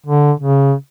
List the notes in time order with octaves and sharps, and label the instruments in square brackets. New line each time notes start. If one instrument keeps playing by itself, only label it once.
[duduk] D3
C#3